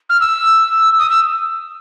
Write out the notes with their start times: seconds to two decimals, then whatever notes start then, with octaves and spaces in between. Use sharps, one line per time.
0.10 F6
0.20 E6
0.99 D#6
1.10 E6